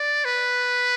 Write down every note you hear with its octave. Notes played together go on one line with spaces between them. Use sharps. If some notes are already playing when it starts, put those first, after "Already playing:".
Already playing: D5
B4